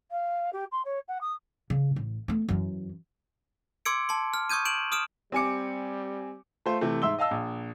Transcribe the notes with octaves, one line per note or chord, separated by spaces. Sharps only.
F5
G4
C6
C#5
F#5
D#6
C#3
A1
A3 B3
F#2 E3
C6 D6 E6 G#6 C#7 D7
A5 C6
F6
C#6 D#6 G6 G#6 D#7
G6 D7 E7 F#7
D#6 F6 D7 E7
G3 C4 G4 G#5 D6 C#7
A3 F4 C5
C3 E3 A3
G#2 E5 C6 E6 G7
D#5 F5 A5 E6
A#1